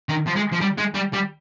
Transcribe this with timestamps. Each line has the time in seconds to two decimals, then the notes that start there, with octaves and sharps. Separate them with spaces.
0.09 D#3
0.27 F3
0.36 G#3
0.52 F3
0.61 G3
0.78 G#3
0.95 G3
1.13 G3